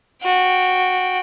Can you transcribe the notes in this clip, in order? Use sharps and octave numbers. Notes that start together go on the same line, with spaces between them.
F#4 G5